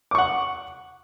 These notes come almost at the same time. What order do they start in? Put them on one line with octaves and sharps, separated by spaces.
D6 C#6 F#5